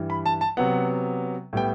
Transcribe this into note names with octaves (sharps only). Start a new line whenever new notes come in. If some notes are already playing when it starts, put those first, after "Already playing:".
Already playing: G2 E3 G3
B5
A5
A5
C3 F#3 B3 F#5
A2 G3 B3 G5